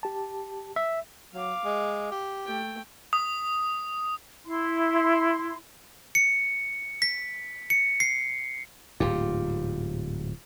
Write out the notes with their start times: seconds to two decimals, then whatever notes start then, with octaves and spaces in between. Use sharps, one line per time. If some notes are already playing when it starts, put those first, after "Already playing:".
0.03 G4 A5
0.76 E5
1.34 F#3 F5 D6
1.65 G#3
2.12 G4
2.46 A3 G5
3.13 D#6
4.46 E4 C6
6.15 C#7
7.02 B6
7.70 C#7
8.00 C7
9.00 D1 G#2 F4 G4